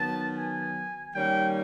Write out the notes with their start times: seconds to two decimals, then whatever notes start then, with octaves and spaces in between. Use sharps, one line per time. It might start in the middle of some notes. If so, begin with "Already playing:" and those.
Already playing: D#3 F#3 B3 A5
0.37 G#5
1.15 D#3 G3 A#3 C#4 G5